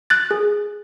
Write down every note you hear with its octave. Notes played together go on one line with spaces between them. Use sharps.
F#6 A6
G#4